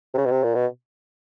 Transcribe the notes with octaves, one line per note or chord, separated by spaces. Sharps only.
C3
C#3
B2
C3
A#2
B2